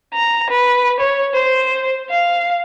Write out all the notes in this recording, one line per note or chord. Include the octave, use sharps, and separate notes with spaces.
A#5
B4
C#5
C5
F5